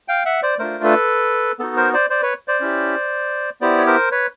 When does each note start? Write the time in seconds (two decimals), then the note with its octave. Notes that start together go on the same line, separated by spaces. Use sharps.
0.08 F5 G5
0.25 E5 F#5
0.42 C5 D5
0.59 A3 D4 F4 A#4 C5
0.84 A4 B4
1.59 B3 D#4 F#4 A4
1.76 A#4 C5
1.93 C5 D5
2.10 C5 D5
2.22 B4 C#5
2.48 C5 D5
2.60 C#4 E4 G4
3.61 B3 E4 G4 C5 D5
3.78 C#5
3.86 A#4 C5
4.12 B4 C#5